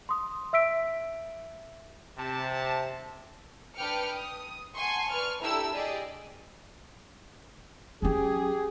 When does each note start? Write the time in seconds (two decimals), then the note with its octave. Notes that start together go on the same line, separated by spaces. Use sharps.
0.09 C6 D#6
0.53 E5 E6 B6 D7
2.17 C3 A5
3.75 D4 B4 G5 D6 F6 C#7
4.11 D#6
4.75 F#5 G#5 A5 C6 C#6
5.09 B4 D5 C#6 F6
5.41 D4 E4 G4 A4 A#5 E6
5.73 G4 G#4 D5 D#5
8.02 F#3 C#4 G4 G#4